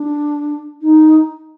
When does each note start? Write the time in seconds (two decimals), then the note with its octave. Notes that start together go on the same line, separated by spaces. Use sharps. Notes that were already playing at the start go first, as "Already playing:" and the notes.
Already playing: D4
0.82 D#4